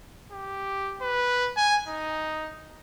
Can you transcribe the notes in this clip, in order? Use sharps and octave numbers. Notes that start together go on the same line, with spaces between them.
G4
B4
G#5
D#4